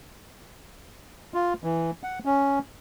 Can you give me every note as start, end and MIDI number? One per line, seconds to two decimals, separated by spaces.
1.34 1.53 65
1.64 1.91 52
2.03 2.19 78
2.25 2.59 61